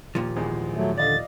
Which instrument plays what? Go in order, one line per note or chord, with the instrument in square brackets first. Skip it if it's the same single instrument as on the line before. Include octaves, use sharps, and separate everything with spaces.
[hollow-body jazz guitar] D#2 A#2 F3
[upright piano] G#1 E2 G#3
[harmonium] F#3 A3
[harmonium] D3 [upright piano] D5 D#5 F5 [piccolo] A6